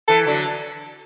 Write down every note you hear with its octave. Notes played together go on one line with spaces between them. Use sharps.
E3 A4
D3 F#3